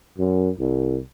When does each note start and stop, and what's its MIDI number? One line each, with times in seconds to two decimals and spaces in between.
0.18 0.49 42
0.59 0.97 36